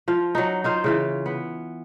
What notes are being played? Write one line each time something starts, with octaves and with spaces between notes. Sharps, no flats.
F3 F4
F#3 D#4
D#4 F4 C5
C#3 E3 F4
B3